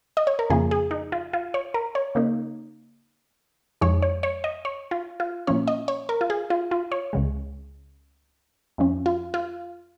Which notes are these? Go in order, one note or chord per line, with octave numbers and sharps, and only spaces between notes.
D#5
C#5
A#4
F2 C#3 F3 A#3 G#4
G#4
D#4
F4
F4
C#5
A#4
C#5
C#3 A#3 D#4
F2 F3 G#3 D#4 C#5
C#5
C#5
D#5
C#5
F4
F4
A#2 F3 C#4 C#5
D#5
C#5
A#4
F4
G#4
F4
F4
C#5
C#2 C#3 G#3
F2 F3 C#4
F4
F4